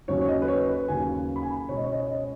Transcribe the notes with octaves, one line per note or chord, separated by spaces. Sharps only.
D#2 C#3 F#3 C#4 C#5
C#5
D#5
B4
C#5
B4
D#2 C#3 F#3 C#4 G#5
B5
G#5
B5
C#2 B2 G#3 C#4 C#5
D#5
C#5
D#5
C#5
D#5
C#5